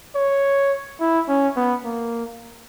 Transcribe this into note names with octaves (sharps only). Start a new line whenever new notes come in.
C#5
E4
C#4
B3
A#3